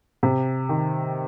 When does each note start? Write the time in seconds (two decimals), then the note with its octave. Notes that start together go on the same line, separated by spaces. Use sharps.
0.23 C3
0.69 D#3